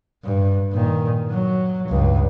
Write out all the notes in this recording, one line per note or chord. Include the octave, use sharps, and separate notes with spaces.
G2
A#2 D#3
F#3
C#2 G2